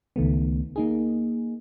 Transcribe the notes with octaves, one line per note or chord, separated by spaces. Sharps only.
C#2 D#3 A3 B3
A#3 D#4 G#4